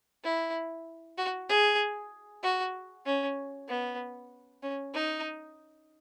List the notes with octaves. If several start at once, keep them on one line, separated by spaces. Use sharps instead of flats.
E4
F#4
G#4
F#4
C#4
B3
C#4
D#4